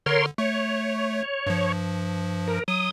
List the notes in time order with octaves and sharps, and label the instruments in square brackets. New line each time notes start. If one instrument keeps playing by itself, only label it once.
[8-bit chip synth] D3 [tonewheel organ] A#4 C#5 C6
[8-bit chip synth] A3 [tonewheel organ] C#5
[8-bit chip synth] G2 F3
[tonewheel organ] A#4
[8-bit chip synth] F#3 [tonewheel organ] D#6